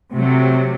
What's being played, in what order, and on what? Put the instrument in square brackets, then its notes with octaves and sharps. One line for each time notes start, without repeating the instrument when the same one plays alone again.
[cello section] C3 F#3 A3